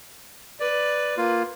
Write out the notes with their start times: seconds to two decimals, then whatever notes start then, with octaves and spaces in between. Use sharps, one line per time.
0.60 B4 D5
1.17 A#3 F4